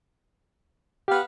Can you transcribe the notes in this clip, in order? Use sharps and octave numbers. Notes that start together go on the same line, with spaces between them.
B3 G4 F5